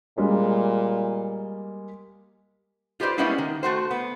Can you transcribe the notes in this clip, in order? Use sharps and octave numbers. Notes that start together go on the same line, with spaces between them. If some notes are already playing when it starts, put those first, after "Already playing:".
A#2 G3 G#3 A#3
F4 G4 B4 C5 D5
G3 G#3 A#3 B3 C#4 E4
D#3
A3 F#4 C5
B3